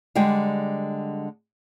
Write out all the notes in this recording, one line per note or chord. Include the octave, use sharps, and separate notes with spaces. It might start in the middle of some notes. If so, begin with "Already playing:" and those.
D3 G3 G#3 G5